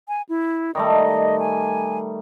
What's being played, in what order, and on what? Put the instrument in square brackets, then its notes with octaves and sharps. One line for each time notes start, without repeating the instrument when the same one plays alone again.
[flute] G#5
E4
[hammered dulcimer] D#3 G3 A3 [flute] D#5
[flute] G#5